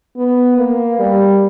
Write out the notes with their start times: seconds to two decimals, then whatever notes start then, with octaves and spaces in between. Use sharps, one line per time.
0.17 B3
0.57 A#3
0.99 G3